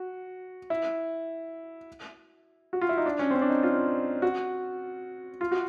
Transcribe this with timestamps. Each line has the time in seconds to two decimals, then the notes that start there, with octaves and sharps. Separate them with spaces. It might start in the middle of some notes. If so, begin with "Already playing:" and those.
Already playing: F#4
0.70 E4
2.73 F#4
2.81 F4
2.89 E4
2.97 D#4
3.06 D4
3.19 C#4
3.31 C4
3.35 C#4
3.42 D4
3.50 D#4
3.63 F4
4.22 F#4
5.41 F4
5.51 F#4